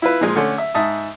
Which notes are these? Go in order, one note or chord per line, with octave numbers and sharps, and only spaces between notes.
E4 F4 B4
A#2 F3 G#3
D3 A3 C#4
E5
G#2 E5 A5 D#6